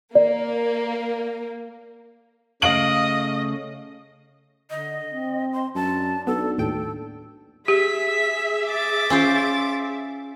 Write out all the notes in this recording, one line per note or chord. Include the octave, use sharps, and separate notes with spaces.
A#3 D5
C#3 A3 C#4 D#5 F5 D7 F#7
D3 D#5
C4
C6
F#2 D4 A5
B1 B3 A4
D#2 A2 A4 G5
G4 G#4 E5 B6
D6 A6
C#4 F4 C5